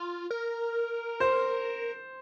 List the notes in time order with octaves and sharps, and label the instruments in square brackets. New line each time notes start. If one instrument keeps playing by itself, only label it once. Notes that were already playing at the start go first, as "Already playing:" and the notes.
Already playing: [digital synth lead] F4
A#4
[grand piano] C5